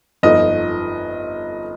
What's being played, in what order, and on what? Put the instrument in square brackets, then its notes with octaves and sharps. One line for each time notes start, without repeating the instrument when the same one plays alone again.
[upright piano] G1 F2 F3 D#4 [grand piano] D#5